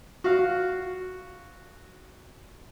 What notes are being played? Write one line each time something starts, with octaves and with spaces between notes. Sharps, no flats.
F#4 F5